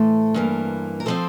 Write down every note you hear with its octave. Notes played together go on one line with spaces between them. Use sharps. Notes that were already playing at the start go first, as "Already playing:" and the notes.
Already playing: A2 E3 A3 A4 C5
G2 E3 A#3
A#4
F3 C4 A4 C5